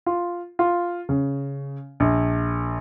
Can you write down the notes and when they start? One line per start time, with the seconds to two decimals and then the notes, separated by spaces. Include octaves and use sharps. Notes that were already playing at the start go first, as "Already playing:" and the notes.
0.06 F4
0.59 F4
1.09 C#3
2.00 A#1